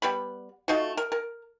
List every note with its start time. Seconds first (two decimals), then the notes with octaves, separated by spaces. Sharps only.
0.02 G3 B3 B5
0.68 A3 D#4 F4 F#4
0.97 A#4
1.12 A#4